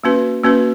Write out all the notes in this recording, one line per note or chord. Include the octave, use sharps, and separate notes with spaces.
A#3 C#4 F#4 B4
A#3 C#4 F#4 B4